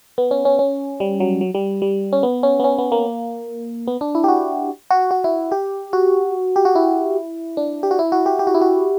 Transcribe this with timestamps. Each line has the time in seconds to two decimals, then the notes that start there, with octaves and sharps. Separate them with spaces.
0.18 B3
0.31 C#4
0.45 C#4
0.59 C#4
1.00 G3
1.20 F#3
1.41 F#3
1.54 G3
1.82 G3
2.13 C#4
2.23 B3
2.43 C#4
2.60 B3
2.64 C#4
2.78 B3
2.92 A#3
3.87 B3
4.01 D4
4.15 E4
4.24 G4
4.28 F#4
4.91 F#4
5.11 F#4
5.24 E4
5.52 G4
5.93 F#4
6.56 G4
6.65 F#4
6.75 E4
7.57 D4
7.83 G4
7.91 F#4
7.99 E4
8.12 F#4
8.26 G4
8.39 G4
8.47 F#4
8.54 E4
8.61 F#4